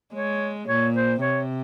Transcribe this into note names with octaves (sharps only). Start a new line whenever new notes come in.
G#3 C#5
A#2 C#5
C5
C3 C#5